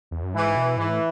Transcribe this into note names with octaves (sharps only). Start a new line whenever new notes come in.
E2
F#2
G#2 E3
B2
G#2 E3
A2